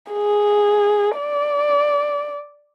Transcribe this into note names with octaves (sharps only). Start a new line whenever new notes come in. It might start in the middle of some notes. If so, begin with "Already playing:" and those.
G#4
D5